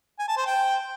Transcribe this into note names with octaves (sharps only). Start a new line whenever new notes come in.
G#5
A5
C5
G5